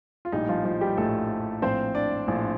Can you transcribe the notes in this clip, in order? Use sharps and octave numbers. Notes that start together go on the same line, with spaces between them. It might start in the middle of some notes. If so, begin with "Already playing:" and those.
F4
A#1 A2 G3 D#4
F3 F4
F3 F4
G3 G4
A#1 A2 G3 A3 A4
A#1 A2 F3 C4 C5
D4 D5
A#1 A2 F3